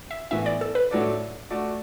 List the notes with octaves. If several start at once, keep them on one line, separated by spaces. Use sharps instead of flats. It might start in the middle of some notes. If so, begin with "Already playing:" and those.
E5
A2 E3 B3 E5
D5
A4
B4
A2 F#3 D4 A4 D5
A3 F#4 D5